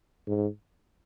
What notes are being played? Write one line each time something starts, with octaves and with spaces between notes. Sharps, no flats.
G#2